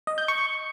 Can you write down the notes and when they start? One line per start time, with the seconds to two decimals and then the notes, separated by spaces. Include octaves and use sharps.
0.07 D#5
0.18 G6
0.28 C#6